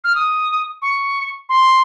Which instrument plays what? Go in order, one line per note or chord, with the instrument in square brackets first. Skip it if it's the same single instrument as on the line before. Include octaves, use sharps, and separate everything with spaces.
[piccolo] F6
D#6
C#6
C6